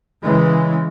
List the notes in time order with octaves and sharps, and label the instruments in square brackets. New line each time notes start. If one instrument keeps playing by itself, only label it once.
[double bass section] C#3 E3 G#3